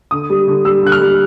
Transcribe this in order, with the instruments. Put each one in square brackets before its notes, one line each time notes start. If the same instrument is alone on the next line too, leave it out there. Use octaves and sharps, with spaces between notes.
[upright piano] D3 D#6
G3
D3
G3 E6
D3 F#6
F6
G3